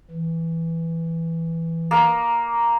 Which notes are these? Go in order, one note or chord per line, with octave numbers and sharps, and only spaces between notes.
E3
A#3